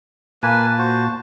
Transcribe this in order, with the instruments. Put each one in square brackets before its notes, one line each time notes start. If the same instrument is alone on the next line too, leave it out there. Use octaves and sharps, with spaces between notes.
[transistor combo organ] A#2 A5 [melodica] A#3 B4 G#5
[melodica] F#4 C5